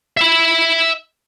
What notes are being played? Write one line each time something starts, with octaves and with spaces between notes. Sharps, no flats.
E5 B5